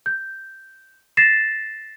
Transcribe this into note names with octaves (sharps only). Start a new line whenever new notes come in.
G6
A6 A#6 C7 E7